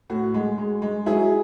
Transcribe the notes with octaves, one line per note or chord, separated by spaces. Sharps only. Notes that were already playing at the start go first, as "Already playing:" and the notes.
A2 F#4
G#3
G#3
G#3
F#3 E4 G#4